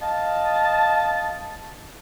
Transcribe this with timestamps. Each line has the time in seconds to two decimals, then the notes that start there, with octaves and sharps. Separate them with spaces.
0.01 D#5 F5 A5